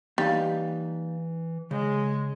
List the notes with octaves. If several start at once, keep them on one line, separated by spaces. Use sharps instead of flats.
E3 G3 A#3 D#4 F5
C#3 G#3